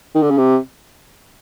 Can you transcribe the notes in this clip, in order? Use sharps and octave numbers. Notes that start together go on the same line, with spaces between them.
D#3
D3
C#3
C3